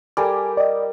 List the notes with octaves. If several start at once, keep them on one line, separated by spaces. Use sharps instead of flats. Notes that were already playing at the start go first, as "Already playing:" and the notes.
G3 A4 A#4 G5 G#5 D6
D5 D#5